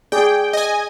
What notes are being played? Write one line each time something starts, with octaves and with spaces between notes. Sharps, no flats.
G#4 D5 G5
D#5 G#5